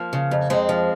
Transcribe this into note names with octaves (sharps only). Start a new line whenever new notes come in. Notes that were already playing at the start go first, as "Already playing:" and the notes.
Already playing: F3 A#3
C#3
F2
F2 G#3 C4
F3